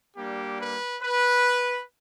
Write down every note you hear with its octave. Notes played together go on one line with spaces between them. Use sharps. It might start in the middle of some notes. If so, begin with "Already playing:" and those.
G3 A#3 D4 G4
B4
B4